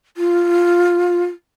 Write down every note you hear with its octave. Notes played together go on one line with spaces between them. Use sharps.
F4